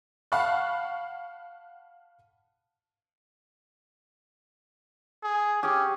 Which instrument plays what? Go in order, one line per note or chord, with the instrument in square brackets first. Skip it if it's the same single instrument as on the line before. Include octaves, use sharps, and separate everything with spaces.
[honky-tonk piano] F5 F#5 A5 B5 C#6 F#6
[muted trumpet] G#4
[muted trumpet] C#4 [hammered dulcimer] G4 G#4